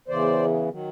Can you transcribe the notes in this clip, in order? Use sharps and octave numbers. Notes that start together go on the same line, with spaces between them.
E2 C#3 E3 C5 D5
D#3 F#3